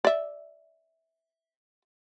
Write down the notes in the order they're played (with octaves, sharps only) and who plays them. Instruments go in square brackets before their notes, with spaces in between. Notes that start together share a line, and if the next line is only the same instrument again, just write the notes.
[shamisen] D5 E5